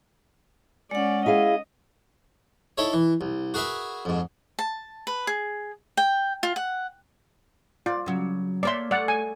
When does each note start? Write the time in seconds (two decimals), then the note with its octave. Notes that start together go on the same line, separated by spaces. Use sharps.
0.91 G#3 C#4 D5 F#5
1.26 E4 G#4 D#5 F5
2.78 D#4 E4 A4 C#5
2.93 E3
3.21 C2
3.54 F#4 G#4 A#4 B4 E5
4.05 F2 G#2
4.59 A5
5.07 B4
5.27 G#4
5.97 G5
6.43 F4
6.56 F#5
7.86 F4 D5
8.06 C#3 F#3
8.63 A#3 C#5 D5 E5 C6
8.91 A3 D5 F#5
9.08 G#5